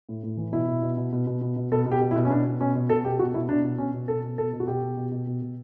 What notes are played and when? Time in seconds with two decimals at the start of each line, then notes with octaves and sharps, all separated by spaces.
0.09 A2
0.23 A2
0.37 E3
0.52 B2 E4
0.67 B2
0.82 B2
0.97 B2
1.12 B2
1.27 B2
1.41 B2
1.56 B2
1.72 B2 A4
1.86 B2
1.91 G4
2.01 B2
2.11 E4
2.15 B2
2.25 C#4
2.30 B2 D4
2.45 B2
2.60 B2 C#4
2.75 B2
2.89 B2 A4
3.04 B2 G4
3.19 B2 F#4
3.34 B2 E4
3.49 B2 D4
3.64 B2
3.78 B2 C#4
3.94 B2
4.08 B2 A4
4.24 B2
4.38 B2 A4
4.53 B2
4.60 F#4
4.67 B2 G4
4.82 B2
4.97 B2
5.11 B2
5.27 B2
5.42 B2